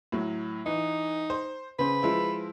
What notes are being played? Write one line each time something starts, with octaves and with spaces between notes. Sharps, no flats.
A2 F#3
E3 D#4
C5
C#3 B4 C5
F3 G#3 E4